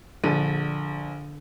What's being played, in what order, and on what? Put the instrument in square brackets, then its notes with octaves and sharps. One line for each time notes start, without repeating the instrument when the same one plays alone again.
[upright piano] A#1 A4 D#7 [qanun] D3